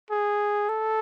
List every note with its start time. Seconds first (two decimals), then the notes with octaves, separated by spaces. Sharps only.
0.11 G#4
0.69 A4